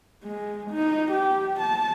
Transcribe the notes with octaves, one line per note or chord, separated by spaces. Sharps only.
G#3
D#4
G4
A5